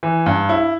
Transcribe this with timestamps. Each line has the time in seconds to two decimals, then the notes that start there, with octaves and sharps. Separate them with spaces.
0.03 E3
0.26 G2
0.49 E4